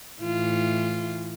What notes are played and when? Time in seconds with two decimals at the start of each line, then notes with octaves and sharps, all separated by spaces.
0.21 A2 E3 F4